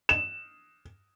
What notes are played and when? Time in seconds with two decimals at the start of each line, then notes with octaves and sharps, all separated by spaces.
0.09 E7